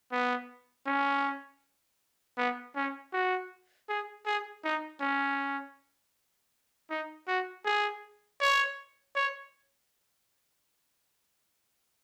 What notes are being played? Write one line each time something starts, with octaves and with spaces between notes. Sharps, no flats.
B3
C#4
B3
C#4
F#4
G#4
G#4
D#4
C#4
D#4
F#4
G#4
C#5
C#5